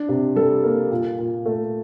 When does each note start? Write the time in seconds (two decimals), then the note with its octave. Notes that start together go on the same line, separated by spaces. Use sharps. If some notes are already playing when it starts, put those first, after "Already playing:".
Already playing: D4
0.09 C3
0.36 G3 A4
0.63 A#3
0.91 A#2
1.18 A#2
1.46 A3